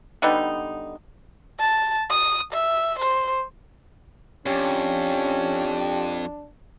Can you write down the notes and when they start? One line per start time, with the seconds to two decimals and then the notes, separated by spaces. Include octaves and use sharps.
0.22 D3 G3 B3 D#4
1.60 A5
2.10 D#6
2.53 E5
2.99 C5
4.46 F2 C#4 D4 G4